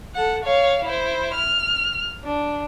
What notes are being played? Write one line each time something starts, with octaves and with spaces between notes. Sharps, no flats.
A4 F#5
C#5 F5
E4 C5
F6
D4